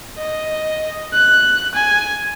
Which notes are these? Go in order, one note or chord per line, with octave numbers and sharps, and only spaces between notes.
D#5
F#6
G#5